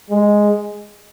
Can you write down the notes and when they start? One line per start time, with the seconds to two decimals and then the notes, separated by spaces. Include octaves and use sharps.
0.10 G#3